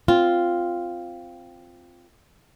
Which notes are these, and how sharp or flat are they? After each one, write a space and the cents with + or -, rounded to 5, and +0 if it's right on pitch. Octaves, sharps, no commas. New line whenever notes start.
C4 +0 F4 +0